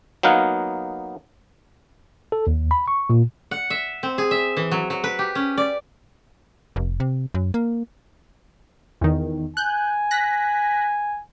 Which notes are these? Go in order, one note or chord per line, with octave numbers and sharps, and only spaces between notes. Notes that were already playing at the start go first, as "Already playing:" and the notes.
F#3 A#3 B3 D#4 F5 F#5
A4
D#2
B5
C#6
A#2
F#5
E5
C4
G#4
E5
E3
F#3
F#3
B4
G4
C#4
D5
F1
C3
F#2
A#3
E2 D#3
G#5 F#6 G6
F#6 A#6 B6